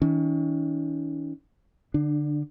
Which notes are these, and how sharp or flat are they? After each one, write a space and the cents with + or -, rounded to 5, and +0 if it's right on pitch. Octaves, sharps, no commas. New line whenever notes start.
D#3 +45 C#4 +40
D3 +0 D4 +30